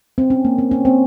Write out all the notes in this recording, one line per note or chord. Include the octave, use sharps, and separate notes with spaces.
C4
C#4
A#3
C4
C#4
C4